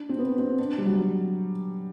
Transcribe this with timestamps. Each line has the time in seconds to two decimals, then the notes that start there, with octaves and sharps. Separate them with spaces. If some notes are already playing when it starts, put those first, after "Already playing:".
Already playing: D4
0.09 C4
0.19 B3
0.39 C4
0.59 D4
0.78 G3
0.85 F#3